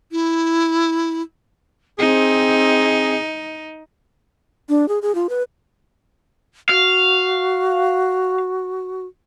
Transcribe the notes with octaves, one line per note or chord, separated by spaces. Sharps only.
E4
C4 D#4 G#4
D4
G#4
G#4
F4
B4
F#4 F5